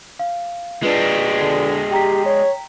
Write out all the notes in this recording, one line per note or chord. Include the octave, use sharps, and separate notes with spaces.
F5
G#3 D4 F4 B4
D3
G4 G5 A#5 B6
C#5